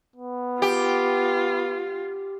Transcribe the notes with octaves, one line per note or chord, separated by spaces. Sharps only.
B3
F4 G4